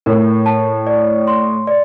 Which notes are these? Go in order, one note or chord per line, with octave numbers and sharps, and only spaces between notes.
A2 A#4
A5
D5
C6
D5